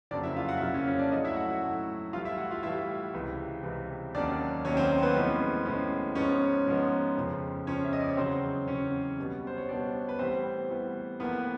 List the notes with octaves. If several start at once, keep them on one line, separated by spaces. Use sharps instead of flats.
F2 C#3 F#3 A#3 D4 D5
E4 E5
F4 F5
F#4 F#5
E5
F2 C#3 F#3 A#3 F4 F5
C#4 C#5
C#4 C#5
D4 D5
A2 F#3 A3 D#4 D#5
E4 E5
F#4 F#5
F#4 F#5
A2 F#3 A3
A2 E3 G3 F4 F5
E4 E5
F#4 F#5
F4 F5
A2 E3 G3 E4 E5
C#2 C3 E3
C#2 C3 E3
D#2 D#3 F#3 A#3 C#4 D4 D5
D#2 D#3 F#3 A#3 C#4 C#5
C4 C5
C5
B3 B4
A2 F3 G#3 C#4
A2 F3 G#3 C#4
G#2 F3 G#3 B3 C#4 C#5
G#2 F3 G#3 B3
F2 C#3 F3
F2 C#3 F3 C#4 C#5
E5
D#5
D5
C#5
E2 C#3 F#3 C4 C5
E2 C#3 F#3 C#4 C#5
B2 G3 B3
C5
C#5
B2 G3 B3 D4 D5
B4
A2 E3 G3 B3 C4 C5
A2 E3 G3 B3
A2 F3 A#3 B3 B4